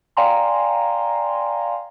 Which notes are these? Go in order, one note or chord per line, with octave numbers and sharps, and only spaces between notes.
D5 F5 G5 G#5 A#5 C6